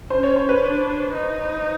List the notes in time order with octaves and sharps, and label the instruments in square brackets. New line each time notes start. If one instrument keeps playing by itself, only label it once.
[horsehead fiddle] C#4 [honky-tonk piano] C5
[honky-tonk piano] C#5
C5
B4
[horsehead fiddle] D4
D#4